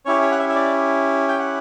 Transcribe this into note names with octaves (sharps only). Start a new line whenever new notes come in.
C#4 E4 G4 C#5
C#5
F#5
E5
E5
D5
G5
F#5